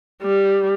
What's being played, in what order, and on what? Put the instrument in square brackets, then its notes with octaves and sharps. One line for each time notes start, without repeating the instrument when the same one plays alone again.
[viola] G3